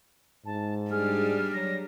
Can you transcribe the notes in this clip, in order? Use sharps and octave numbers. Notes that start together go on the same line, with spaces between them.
G#2 A5
G3 D4 G#4 F6
F#3 A#6